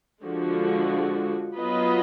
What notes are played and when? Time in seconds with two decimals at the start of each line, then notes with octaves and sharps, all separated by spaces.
0.24 D3 F3 G#3 D4 F#4
1.57 F#3 B3 F4 B4 D#5